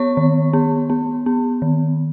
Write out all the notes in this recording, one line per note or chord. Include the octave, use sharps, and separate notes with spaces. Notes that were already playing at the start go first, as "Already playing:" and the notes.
Already playing: B3 C#5 C#6
D#3
B3
B3
B3
D#3